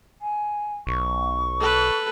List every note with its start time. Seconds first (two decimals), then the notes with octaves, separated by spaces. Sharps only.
0.21 G#5
0.87 B1 C#6
1.60 A4 B4